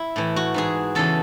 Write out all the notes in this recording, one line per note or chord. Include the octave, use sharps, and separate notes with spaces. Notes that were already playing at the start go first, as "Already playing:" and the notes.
Already playing: E4
A2 E3
F#4
G#2 E3 G#4
E2 C#3 E3 A4